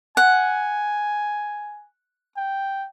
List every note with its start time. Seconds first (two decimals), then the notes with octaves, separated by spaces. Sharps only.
0.17 F#5 G#5
2.37 G5